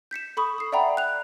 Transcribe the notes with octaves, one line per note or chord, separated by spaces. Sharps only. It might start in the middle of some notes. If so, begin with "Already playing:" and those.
G6 B6 C#7 E7
A4 B5 C#6 D#6
D#6 C7
D5 E5 F#5 G5 A#5 B5
F#6 F7